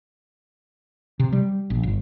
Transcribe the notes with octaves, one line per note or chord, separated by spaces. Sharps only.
C3
G3
A#1
G1